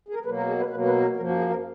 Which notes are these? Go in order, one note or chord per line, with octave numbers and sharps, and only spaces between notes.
G#4
A#4
B2 F#3 A#3 B4
A#4
G#4
B4
B2 F#3 A#3 B4
B4
A#4
F#2 F3 A#3 A#4
F#4
G#4
A#4